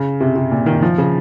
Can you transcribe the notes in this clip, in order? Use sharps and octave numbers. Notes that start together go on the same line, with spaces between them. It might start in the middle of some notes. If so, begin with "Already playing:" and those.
Already playing: C#3
C3
C3
A#2
D#3
F3
C#3